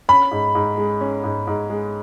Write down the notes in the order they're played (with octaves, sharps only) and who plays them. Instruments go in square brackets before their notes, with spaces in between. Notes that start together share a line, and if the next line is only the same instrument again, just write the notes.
[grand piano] C#4 [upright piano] B5
[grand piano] G#2
G#2
G#3
C#4
G#2
G#2
G#3